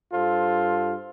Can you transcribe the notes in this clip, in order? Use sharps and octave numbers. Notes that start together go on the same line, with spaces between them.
G2 F4 A4 C5